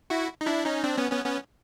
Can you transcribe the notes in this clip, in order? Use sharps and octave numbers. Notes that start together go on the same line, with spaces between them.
E4 F#4
D#4
D4 E4
C#4 D#4
C4 D4
B3 C#4
B3 C#4
B3 C#4